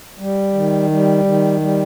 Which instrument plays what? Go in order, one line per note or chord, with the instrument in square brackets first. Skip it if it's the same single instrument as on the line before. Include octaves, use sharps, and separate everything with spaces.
[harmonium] G3
D#3
G3
D#3
G3